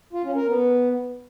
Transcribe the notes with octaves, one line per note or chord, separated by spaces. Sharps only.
F4
C#4
A#4
B3